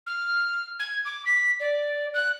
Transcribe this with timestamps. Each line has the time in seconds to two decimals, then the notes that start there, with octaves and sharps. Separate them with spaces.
0.07 F6
0.79 G#6
1.05 D6
1.26 B6
1.60 D5
2.14 F#6